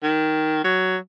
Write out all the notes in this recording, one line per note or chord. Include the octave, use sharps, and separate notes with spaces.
D#3
F#3